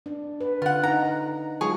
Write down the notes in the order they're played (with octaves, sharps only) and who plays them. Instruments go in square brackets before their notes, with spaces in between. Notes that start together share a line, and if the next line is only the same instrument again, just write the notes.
[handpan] D4
B4
[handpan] D3 [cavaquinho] F4 F#5
[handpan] D#4 [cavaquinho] A#5
[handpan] F#3 G#3 F4 [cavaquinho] G#4 C#5 D#6